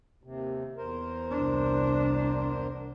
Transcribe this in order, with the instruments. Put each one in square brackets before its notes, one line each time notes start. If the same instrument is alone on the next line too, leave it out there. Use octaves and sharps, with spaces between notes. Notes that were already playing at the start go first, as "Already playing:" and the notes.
[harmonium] D#2 C3
E2 A#4 C5
[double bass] C2 D4